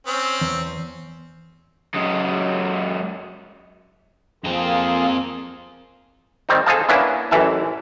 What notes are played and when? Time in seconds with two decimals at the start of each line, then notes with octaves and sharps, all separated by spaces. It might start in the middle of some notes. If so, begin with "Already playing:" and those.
0.07 C4 C#4
0.41 E2
1.95 F#2 G#3
4.44 F2 A#3 C4 F4 G#4
6.49 D#3 G3 C4 D#4
6.66 G#4 A4 C5 D#5 F5 A5
6.89 A#3 B3 C#4 D4 E4
7.31 A1 F#2 E3 E5 A5